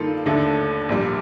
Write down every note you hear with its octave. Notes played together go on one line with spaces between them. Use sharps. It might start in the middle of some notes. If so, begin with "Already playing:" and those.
Already playing: G2 D#3 A#3 F4 A4
D#2 D3 A3 D4 A4
A#1 A#2 G3